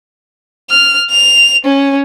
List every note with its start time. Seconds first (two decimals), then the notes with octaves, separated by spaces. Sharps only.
0.70 F6
1.11 F7
1.64 C#4